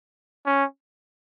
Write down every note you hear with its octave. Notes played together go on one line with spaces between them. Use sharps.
C#4